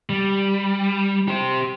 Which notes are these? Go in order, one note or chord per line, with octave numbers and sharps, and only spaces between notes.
G3
G4 C5